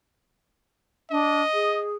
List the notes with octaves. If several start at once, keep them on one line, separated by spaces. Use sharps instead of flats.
D4 D#5
G#4